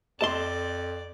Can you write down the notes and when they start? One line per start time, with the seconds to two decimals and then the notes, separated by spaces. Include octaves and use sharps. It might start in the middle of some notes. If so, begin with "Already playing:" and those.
0.21 F2 A4 D5 D#5 A5 C6